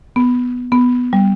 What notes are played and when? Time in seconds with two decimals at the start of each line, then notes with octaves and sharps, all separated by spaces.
0.16 B3
0.72 B3
1.13 G3